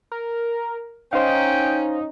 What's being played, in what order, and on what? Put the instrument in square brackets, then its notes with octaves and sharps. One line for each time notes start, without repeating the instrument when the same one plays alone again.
[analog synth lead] A#4
[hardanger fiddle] C#4 [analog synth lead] D#4 [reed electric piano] C5 F5 [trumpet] G5